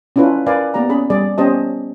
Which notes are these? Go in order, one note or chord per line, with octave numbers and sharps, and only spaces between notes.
C#4 D4 E4 F4 B4
A#4 B4 D5 F5 G#5
A#3 B3 G4 D5 A#5
C#4 G#4 B5
G3 G#4 D5
B3 C#4 G4 C5 D#5 A5